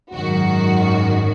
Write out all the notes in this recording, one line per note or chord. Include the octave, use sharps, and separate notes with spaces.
G#1 F#2 D#3 F#4